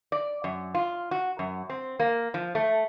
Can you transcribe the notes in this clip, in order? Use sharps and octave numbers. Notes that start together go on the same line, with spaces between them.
D5
F#2
F4
F#4
F#2
C4
A#3
F3
A3